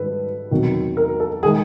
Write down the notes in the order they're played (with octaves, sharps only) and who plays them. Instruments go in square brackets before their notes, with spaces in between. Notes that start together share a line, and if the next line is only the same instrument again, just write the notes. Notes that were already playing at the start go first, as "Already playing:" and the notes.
Already playing: [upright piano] G#2 D#3 G3 A4 B4
E2 C3 D#3 F#3
A#4
A4
D#3 G#3 G#4